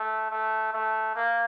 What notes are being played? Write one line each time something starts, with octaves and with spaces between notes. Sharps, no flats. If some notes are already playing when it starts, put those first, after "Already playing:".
Already playing: A3
A3
A3
A#3